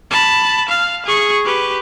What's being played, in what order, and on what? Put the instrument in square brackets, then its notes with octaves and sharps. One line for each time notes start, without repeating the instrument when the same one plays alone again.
[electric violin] A5 B5
F5
G#4 C#6
G4 B4